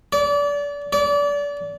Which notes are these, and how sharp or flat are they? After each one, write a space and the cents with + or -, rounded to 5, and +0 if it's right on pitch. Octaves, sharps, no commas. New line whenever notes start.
D5 -30
D5 -30